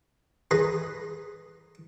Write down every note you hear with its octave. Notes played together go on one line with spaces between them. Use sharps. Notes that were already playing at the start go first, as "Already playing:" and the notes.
G#4 B4 A#5 C6